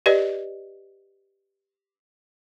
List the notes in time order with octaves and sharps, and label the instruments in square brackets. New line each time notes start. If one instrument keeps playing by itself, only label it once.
[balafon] G4 B4 D5 D#5